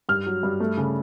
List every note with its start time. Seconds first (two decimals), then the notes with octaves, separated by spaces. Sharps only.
0.09 G2 F6
0.26 F#3
0.43 G2
0.60 A3
0.77 C#3